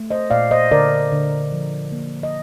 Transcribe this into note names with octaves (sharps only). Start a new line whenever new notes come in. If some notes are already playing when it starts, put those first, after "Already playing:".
Already playing: A3
C5 D#5
A#2 D5 F5
C5 D#5
D3 A#4 D5
D3
F3
A#3
D#5